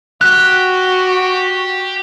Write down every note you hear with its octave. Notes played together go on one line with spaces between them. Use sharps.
F#4 G4 F#6